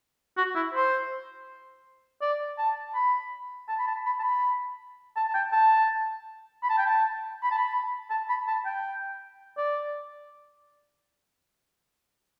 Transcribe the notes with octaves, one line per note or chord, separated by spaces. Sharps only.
F#4
E4
C5
D5
A5
B5
A5
B5
A5
B5
A5
B5
A5
A5
G5
A5
B5
A5
G5
A5
B5
A5
B5
A5
B5
A5
G5
D5